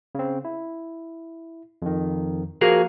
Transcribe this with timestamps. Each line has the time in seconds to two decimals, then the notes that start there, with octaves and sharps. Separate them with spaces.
0.15 C#3 C4
0.45 E4
1.82 F2 D#3
2.61 F3 A#3 F#4 G#4 A#4 F5